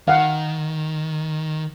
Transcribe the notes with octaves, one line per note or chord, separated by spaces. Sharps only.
D#3 F5 F#5